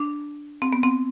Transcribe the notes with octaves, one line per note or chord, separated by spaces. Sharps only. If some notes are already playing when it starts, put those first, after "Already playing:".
Already playing: D4
C4
B3
C4